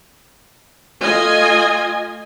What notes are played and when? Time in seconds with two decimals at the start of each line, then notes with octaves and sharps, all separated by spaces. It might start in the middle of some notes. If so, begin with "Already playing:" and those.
1.02 A3 F4 D#5 G#5